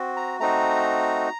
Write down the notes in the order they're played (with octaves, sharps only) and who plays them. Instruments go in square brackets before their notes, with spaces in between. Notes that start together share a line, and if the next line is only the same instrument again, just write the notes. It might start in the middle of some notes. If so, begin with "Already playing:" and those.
Already playing: [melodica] C4 F#4
A#5
A3 C4 D#4 F#4 A#5